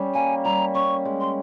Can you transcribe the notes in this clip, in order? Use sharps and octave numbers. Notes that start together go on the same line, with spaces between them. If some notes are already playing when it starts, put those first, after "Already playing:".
Already playing: G3 C#4
A#3 G#5
G3 A#5
C#4 C#6
G#3
C6